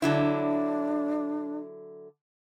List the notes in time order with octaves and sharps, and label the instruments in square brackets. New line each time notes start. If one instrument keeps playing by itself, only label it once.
[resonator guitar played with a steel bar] D3 F#3 E4 [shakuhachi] D4